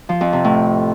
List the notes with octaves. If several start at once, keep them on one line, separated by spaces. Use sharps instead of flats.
F3
F2
C3
A2